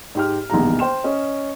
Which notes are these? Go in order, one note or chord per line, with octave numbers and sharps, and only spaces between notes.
G#2 G4 F6
A#1 E2 B2 D#3 G3 A#5
C5 G5 C6 E7
C#4 D#5